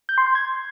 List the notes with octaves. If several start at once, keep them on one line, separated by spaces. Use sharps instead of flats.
G6
C6
G6
G#6